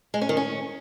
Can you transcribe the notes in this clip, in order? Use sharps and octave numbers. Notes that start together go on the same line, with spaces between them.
G#3
C#4
D#3
C#4